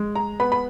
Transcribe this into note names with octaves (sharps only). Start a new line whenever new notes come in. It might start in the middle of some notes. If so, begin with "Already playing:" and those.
Already playing: G#3
A#5
B3 B5
B5